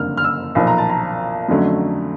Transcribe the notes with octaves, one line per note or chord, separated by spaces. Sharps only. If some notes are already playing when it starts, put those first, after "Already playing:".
Already playing: F#1 F2 D3 G3 A#3 F6
F6
E6
B1 A#2 F3 B5
A#5
A5
A#5
F2 D3 F#3 A3 C#4